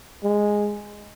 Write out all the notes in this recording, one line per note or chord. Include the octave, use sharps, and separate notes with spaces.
G#3